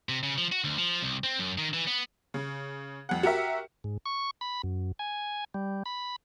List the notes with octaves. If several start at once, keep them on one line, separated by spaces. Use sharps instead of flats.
C3
C#3
F3
F#4
D2
F3
C2
C4
F#2
D#3
E3
B3
C#3
F2 F#5
F#4 G4 A#4 E5
G#2
C#6
B5
F#2
G#5
G3
B5